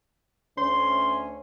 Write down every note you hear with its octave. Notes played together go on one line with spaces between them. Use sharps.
D2 A3 C#4 C6